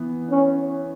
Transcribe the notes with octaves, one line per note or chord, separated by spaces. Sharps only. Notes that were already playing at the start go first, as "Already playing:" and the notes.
Already playing: E3 B3
C#4